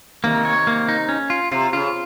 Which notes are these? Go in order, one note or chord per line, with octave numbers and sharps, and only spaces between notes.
C3 D#3 A#3
C#5
A#3
D#4
C#4
F4
C3 F4
C#3 F4